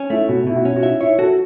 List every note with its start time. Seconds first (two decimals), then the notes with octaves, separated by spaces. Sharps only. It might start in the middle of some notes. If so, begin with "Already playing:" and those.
Already playing: C#4
0.10 A3 E4
0.28 B2 F#4
0.47 B2 E4
0.56 F#4
0.65 C#4
0.76 F#4
0.83 E4 E5
1.01 E4 C#5
1.19 F#4 A4